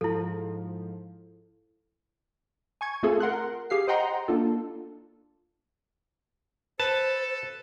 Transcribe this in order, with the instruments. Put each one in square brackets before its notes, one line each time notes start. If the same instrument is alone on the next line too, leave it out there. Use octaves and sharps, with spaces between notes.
[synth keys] G#2 F3 [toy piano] E4 A4
[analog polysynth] G#5 C#6 G#6
A3 C4 F4 G#4 A4
A#4 F#5 C6 F#6
G4 G#4 F5 C7
C5 D#5 F#5 G5 A#5 C6
A#3 D4 F4 A4
[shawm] A4 [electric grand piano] B4 [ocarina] C5 [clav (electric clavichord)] A5